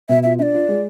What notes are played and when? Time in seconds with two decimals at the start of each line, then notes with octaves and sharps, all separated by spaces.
0.09 B2 E5
0.23 F4 E5
0.39 D4 D5 E5
0.54 F4
0.68 G#3